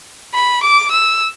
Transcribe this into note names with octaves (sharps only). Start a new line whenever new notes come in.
B5
D6
E6